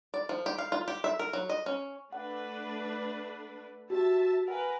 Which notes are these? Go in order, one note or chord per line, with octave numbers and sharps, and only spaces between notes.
D5
F3
G4
F5
F4
G4
E5
A#4
F#3
D#5
C#4
A3 D4 B4 F#5
F#4 G4 E5 A5
A#4 B4 F#5 G#5